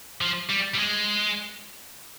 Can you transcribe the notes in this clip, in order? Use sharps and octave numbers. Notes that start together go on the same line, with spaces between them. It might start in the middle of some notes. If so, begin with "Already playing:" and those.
F3
G3
G3
G#3